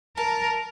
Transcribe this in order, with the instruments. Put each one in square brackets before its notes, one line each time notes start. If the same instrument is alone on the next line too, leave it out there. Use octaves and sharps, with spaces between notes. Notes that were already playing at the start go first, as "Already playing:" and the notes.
[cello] A#4 [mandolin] A5